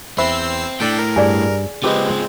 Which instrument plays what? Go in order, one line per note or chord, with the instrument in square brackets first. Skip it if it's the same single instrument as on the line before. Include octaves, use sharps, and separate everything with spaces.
[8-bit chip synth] E2 E6 C7 [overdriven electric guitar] C4 [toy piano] C5 B5 [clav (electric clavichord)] E5
[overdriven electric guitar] A2 [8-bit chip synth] D4 A4 G5
[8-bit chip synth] A#4
[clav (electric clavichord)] G2 [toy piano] G#4 D5 G#5
[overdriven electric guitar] F3 G#3 [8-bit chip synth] C4 [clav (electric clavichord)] G4 B4 D#5 [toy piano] G#4